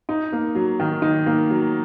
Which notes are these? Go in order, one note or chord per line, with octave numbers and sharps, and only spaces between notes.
D#4
A#3
F#3
D#3
D#4
A#3
F#3